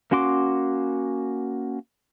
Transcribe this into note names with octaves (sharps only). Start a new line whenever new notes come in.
A#3 C#4 F#4 C6 D6